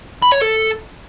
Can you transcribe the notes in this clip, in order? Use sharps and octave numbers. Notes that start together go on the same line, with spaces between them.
B5
C#5
A4